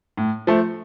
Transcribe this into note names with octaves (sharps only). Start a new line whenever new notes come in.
A2
F3 A3